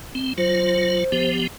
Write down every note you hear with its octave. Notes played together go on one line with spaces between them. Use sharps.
C4
F#3 F4 C5
F3 B3 G4